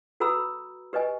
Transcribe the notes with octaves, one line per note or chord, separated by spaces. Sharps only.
F#4 A4 B4 A#5 B5 E6
G4 B4 D#5 G#5